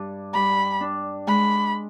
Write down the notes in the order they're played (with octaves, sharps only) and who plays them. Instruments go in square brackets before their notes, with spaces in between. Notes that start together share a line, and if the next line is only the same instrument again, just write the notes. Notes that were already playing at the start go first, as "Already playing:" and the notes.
Already playing: [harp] G2 D4
[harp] G3 [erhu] B5
[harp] D4
[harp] G#3 [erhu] B5